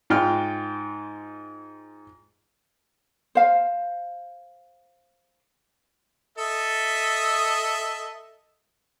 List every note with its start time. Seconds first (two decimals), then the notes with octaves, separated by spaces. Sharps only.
0.10 G#2 F4 G5 F6
3.35 C5 F5
6.38 A4 D#5 E5